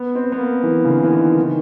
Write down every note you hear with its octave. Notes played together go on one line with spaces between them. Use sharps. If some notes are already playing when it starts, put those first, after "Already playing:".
Already playing: B3
C4
B3
A#3
E3
C#3
D3
E3
D#3
D#3